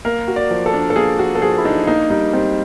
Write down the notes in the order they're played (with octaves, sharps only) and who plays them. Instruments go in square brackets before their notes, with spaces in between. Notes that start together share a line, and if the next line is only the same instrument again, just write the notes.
[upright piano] A#3 [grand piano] A#4
[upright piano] F#4
[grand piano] D5
[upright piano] F3
[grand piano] A4
[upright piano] D4
[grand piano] A4
[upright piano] A#3 [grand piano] G#4
[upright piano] F#4
[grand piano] A4
[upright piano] F3 [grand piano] G#4
[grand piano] E4
[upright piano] D4 [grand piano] D#4
[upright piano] A#3 [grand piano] D#4
[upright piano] G3 [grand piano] D#4
[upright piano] G3 [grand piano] C4